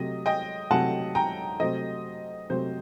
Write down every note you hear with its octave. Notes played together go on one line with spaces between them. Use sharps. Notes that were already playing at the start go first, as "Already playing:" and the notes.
Already playing: C3 F#3 A3 D#5
D#5 G5
C3 F#3 A3 F#5 A5
G5 A#5
C3 F#3 A3 C5 D#5
C3 F#3 A3 C5